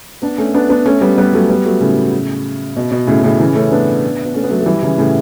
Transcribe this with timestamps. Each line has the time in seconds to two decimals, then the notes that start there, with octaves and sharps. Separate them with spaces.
0.22 B3 D4
0.38 A3 C#4
0.54 B3 D4
0.69 B3 D4
0.86 A3 C#4
1.01 G3 B3
1.18 G3 B3
1.33 F#3 A3
1.49 G3 B3
1.65 F#3 A3
1.81 A2 C#3
2.77 B2
2.91 B2
3.07 A2 C#3
3.24 A2 C#3
3.40 C#3 E3
3.55 A3 C#4
3.72 B3 D4
4.25 B3
4.34 A3 C#4
4.43 B3
4.50 F#3 A3
4.61 A3
4.66 E3 G3
4.83 C#3 E3
4.98 A2 C#3